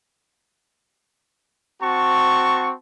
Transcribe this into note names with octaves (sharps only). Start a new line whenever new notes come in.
C4 F#4 A5 C#6